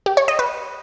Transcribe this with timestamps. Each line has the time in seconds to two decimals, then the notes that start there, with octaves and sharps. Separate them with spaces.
0.06 G4
0.17 C#5
0.28 D#5
0.39 B4